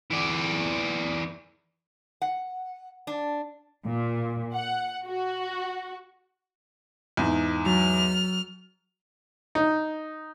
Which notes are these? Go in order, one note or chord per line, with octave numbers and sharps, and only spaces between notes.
E3 D5
F#5
D4
A#2
F#5
F#4
E2 G#2
F#3 F6
D#4